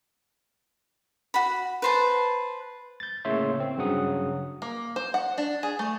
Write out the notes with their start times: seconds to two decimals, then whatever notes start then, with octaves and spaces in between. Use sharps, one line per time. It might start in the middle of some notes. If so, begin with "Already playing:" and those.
1.34 F#4 B5
1.82 B4 C5 A5
3.00 G6 A6
3.25 A2 C#3 A#3 C#5 E5 C6
3.60 C4
3.78 G2 C#3 F#3 F#5 D#6
4.62 A#3
4.96 C5
5.14 F#5
5.38 D4
5.63 G#4
5.79 A3